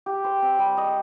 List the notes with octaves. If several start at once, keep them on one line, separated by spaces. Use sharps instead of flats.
G4
C5
C4
G3
D#5